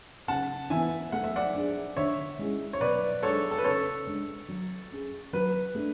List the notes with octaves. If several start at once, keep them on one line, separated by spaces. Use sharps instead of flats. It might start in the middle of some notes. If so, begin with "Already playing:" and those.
C#3 F#5 A5
E3 B3 E5 G#5
A3 F#5
E5
D5 F#5
D4 G#4
D3 C#5 E5
G#3 C#4 E4 G#4
C#5
B2 B4 D5
G#3 D4 G#4 A4 C#5
A4
B4
C#3 A4 C#5
G#3 D4
F#3
C#4 G#4
F#3 B4
A3 D4